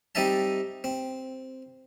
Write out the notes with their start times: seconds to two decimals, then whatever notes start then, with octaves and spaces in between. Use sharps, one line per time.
0.15 G3 C4 D#4 D#5 E5 A5
0.84 C4